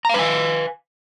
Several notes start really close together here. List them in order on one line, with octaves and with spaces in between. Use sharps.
A#5 F5 B4 G#5